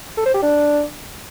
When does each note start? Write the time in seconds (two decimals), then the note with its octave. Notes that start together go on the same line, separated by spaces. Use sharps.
0.18 A4
0.26 C5
0.34 G4
0.43 D4